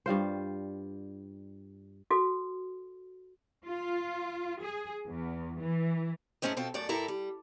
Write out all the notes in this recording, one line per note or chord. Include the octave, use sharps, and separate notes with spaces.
G2 G3 F4 C5
F#4 A4
F4
G#4
E2
E3
G#2 F#3 A3 C#4 C5 D#5
B2 C4 F4 A4
F#2 A3 D5
G2 E4 A4 A#4 A#5
G3